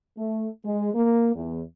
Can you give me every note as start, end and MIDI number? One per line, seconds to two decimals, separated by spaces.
0.17 0.48 57
0.65 0.94 56
0.95 1.32 58
1.34 1.61 40